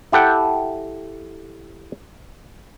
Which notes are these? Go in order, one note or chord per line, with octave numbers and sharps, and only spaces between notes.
E4 G4 A4 F#5 G5